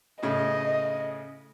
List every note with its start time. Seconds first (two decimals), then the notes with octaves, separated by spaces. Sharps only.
0.23 A2 C#3 D#5